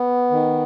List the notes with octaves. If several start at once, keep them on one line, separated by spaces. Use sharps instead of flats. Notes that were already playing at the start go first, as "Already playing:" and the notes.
Already playing: B3
D#3